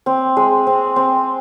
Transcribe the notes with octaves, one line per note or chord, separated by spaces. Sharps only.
C4
G#3
C4
C4